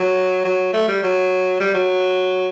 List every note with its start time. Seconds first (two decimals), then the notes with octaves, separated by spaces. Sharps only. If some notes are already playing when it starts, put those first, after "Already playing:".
Already playing: F#3
0.44 F#3
0.73 A3
0.88 G3
1.03 F#3
1.60 G3
1.74 F#3